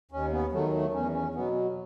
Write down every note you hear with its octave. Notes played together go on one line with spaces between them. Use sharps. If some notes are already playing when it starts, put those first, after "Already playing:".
D#2 C#4
B3
D#3 F#3 A3
A3
E2 C#4
C#4
B2 F#3 B3